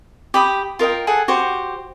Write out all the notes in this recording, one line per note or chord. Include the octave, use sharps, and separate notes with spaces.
G4 B5 D#6
F4 A#4 D#5 G5
G#4 A4 F#5
F#4 G4 C5